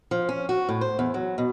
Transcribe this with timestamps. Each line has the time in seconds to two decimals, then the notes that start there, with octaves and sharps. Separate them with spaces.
0.11 F3
0.29 C#4
0.49 F#4
0.69 A2
0.81 C5
0.99 E2
1.14 F#3
1.38 B2